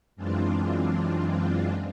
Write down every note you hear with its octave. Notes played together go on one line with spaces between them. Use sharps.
F#2 E3 G#3 C4 D4 F4